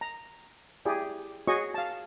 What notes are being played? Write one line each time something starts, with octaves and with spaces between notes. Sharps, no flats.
A#5
E4 G4 G#4 D5
F#4 G#4 C#5 D#5 C#6
F5 A5